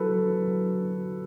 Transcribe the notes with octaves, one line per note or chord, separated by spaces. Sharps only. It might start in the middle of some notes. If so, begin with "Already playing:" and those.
Already playing: F#3 E4 A4 B4
F#3
F#3
F#3